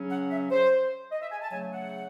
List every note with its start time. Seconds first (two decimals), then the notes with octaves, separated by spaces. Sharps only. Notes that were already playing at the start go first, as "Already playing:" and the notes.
Already playing: C#3 F#3 C#4
0.10 F#5
0.30 E5
0.50 C5
1.12 D#5
1.21 E5
1.31 G#5
1.41 A5
1.51 C#3 F#3 A3 G#5
1.72 F#5